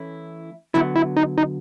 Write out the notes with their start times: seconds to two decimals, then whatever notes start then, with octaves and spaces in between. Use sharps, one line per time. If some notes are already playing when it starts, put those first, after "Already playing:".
Already playing: E3 A3 C#4 E4
0.74 D3 F#3 B3 E4
0.96 E4
1.16 D#4
1.38 D#4